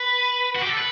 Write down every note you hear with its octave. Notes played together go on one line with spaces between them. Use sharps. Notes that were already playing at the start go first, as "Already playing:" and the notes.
Already playing: B4
F#4
G4
A4
B4